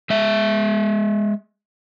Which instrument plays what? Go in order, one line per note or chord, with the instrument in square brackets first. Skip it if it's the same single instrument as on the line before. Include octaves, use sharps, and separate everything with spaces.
[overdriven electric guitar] G#3 E5